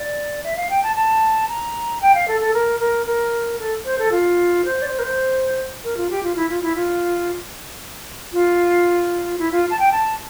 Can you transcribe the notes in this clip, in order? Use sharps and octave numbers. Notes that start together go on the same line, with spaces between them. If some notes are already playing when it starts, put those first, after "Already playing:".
Already playing: D5
E5
F5
G5
A5
A5
A#5
G5
F5
A4
A4
A#4
A#4
A#4
A4
C5
A4
F4
C5
D5
C5
A#4
C5
A#4
F4
G4
F4
E4
F4
E4
F4
F4
E4
F4
A5
G5
A5